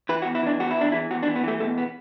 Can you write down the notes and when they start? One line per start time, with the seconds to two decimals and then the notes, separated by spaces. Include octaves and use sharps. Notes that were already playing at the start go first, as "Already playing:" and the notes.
0.09 E3 B4
0.22 F#4
0.25 E2
0.35 E4
0.43 E3 D4
0.60 E2 F#4
0.71 E4
0.76 E2 D4
0.92 E3 E4
1.10 E2 F#4
1.23 D4
1.28 E3
1.36 B3
1.43 E3 A3
1.60 B2 A3
1.78 B3